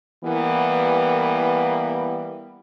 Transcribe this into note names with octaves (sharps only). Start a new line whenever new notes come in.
E3 G3 A#3 B3